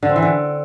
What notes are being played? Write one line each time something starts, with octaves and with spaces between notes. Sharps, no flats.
D3
C4
E3
D3